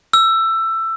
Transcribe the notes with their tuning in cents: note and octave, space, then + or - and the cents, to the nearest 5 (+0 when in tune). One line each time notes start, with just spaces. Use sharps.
E6 +15